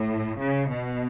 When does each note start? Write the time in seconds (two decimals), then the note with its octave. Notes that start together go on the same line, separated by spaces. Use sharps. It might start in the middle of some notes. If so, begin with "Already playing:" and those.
Already playing: A2
0.39 C#3
0.70 B2